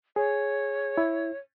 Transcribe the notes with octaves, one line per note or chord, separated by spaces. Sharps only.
G#4 C#5
E4